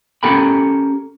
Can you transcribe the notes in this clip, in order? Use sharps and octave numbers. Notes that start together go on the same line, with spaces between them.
C#4 G4 A4 A#4 G5 B5